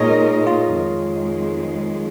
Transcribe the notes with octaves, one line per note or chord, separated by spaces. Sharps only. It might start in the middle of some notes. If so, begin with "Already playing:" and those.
Already playing: A#2 G#3 D#4 F4 G#4 A#4 C#5 D#5
F4
F2 D#3 G#3